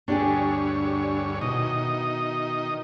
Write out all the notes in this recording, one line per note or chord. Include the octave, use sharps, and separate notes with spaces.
D2 G2 D4 G4 G#4 C#5
B2 D#3 E4 D#5